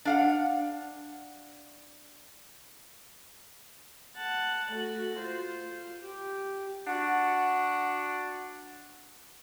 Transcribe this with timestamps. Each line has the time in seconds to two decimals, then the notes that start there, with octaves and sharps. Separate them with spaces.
0.05 D4 F5 F#5
4.17 F#5 A5
4.72 A3 F#4
5.18 F4 C5
6.02 G4
6.87 D4 F#4 F#5